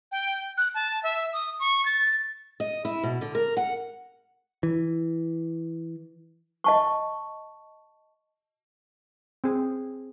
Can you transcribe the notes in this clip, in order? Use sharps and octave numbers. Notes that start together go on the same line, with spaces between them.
G5
F#6
A5
E5
D#6
C#6
A6
D#5
E4
B2
D3
A#4
F#5
E3
D#5 A5 C#6
C4 G#4